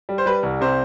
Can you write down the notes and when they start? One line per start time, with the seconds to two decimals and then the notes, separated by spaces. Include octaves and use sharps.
0.09 G3
0.18 C5
0.26 G3 B4
0.43 C2
0.61 C3 C5